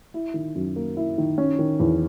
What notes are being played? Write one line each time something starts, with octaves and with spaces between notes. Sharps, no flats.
E4
D#3
F#2
A#3
E4
D#3
C#4
D#3
E2